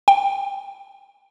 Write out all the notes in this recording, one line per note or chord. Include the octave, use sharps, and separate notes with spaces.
G5